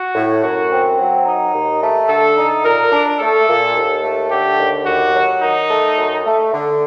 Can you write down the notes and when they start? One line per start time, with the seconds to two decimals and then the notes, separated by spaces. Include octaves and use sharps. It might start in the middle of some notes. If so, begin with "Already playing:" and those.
Already playing: F#4
0.14 A2
0.42 F#2 F#4
0.70 C4
0.98 F#3
1.25 D#4
1.53 D#2
1.81 A3
2.09 D3 A4
2.37 D#4
2.64 A#2 A#4
2.92 D4
3.19 A3 A4
3.47 A#2
3.75 D#2
4.03 A3
4.31 D3 G4
4.58 D#2
4.86 D#2 F#4
5.14 F#3
5.42 D#3 D#4
5.69 A3
5.97 F#2
6.25 A3
6.53 D3